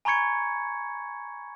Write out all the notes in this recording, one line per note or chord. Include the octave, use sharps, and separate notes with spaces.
G#5 A#5 B5 C#6 G#6 C#7